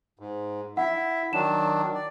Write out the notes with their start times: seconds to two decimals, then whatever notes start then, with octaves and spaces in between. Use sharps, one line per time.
0.19 G#2
0.77 E4 E5 F#5
1.33 D#3 F#3 D4 E7
1.94 D5